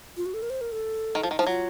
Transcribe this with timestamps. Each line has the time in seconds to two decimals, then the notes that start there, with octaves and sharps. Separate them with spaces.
0.17 F4
0.26 F#4
0.34 A4
0.42 A#4
0.50 C5
0.61 A#4
0.72 A4
1.15 D#3
1.23 F3
1.31 D#3
1.39 F3
1.42 D#4
1.47 F#3 F4